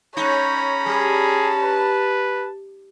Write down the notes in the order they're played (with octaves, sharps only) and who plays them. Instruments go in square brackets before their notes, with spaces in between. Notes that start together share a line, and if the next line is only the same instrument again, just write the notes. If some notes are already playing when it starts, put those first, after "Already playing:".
[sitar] G#3 D#4 [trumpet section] C#4 A#5 B5 [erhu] C#5
[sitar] G3 [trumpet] G#4 [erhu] A5
[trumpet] B4